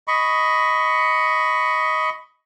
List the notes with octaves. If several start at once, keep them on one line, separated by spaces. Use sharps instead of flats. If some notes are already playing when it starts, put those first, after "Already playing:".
D#5 B5 C#6